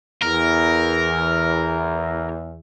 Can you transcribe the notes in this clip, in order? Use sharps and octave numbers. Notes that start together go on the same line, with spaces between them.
E2 A#4